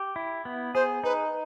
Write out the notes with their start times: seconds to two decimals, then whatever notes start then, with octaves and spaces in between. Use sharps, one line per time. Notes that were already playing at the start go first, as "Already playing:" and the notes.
Already playing: G4
0.16 E4
0.45 B3
0.75 G#4 C5
1.04 D#4 B4